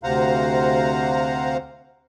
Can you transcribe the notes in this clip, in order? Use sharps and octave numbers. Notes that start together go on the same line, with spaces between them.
D2 C3 C5 F5 F#5 A#5